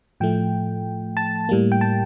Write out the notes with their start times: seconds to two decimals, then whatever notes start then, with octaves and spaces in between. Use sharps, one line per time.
0.20 A2 F3 A3 G5
1.17 A5
1.49 A2 G3 A#3
1.72 G5
1.81 A5